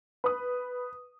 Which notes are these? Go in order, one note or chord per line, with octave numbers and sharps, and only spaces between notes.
B4 D#6